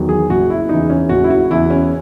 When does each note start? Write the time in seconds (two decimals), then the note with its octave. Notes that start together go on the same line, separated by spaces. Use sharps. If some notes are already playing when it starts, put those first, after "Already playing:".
Already playing: E2 D#3 F#3
0.09 G#4
0.30 F#1 F#4
0.50 E4
0.69 E2 C#3 E3 D#4
0.90 C#4
1.09 F#1 F#4
1.24 E4
1.30 F#4
1.50 E2 C#3 E3 E4
1.70 C#4